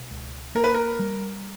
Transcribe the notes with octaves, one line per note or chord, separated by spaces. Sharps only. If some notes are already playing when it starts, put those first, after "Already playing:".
Already playing: B2
C#2
A#3 A#4
B4
A#4
G3